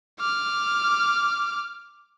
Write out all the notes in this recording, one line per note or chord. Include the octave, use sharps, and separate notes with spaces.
D6 F6